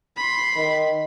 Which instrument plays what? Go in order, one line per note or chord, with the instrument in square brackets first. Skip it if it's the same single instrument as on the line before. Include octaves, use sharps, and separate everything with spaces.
[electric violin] B5 C6
[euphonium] D#3